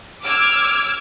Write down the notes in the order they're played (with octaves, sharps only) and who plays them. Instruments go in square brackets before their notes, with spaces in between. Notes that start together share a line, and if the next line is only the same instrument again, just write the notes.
[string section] D6 E6 F6 G#6